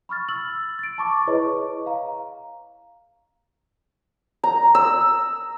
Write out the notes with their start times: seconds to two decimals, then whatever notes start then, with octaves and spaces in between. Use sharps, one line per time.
0.09 B5 C#6 F6 A6
0.29 E6 A6 F#7
0.79 A6 D7
0.98 A5 B5 C#6 D6
1.27 E4 G#4 B4 C#5 D#5 C#6
1.86 F5 A#5
4.44 A#5
4.75 E6